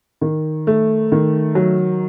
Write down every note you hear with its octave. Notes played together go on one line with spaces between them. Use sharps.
D#3
A3
D#3
F#3